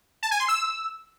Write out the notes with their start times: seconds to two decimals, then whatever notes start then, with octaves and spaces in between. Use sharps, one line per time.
0.23 A5
0.31 G#5
0.40 C6
0.48 E6